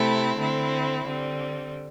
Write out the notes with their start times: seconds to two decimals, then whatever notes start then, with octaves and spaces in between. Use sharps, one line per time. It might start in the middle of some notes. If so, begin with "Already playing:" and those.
Already playing: C3 A3 C4 E4
0.38 D3 C4 E4
1.05 D3 G3 C4